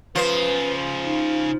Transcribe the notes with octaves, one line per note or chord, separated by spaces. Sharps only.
C#3 F3 B4 C5
D#4